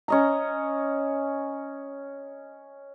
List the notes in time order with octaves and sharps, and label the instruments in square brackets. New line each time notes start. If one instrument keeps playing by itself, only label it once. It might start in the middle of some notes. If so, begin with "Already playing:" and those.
[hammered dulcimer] C#4 D#5 A#5